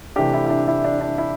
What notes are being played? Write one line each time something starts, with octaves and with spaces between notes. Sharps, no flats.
C3 E3 A3 D4 G4
E4
E4
D4
E4
D4
D4
E4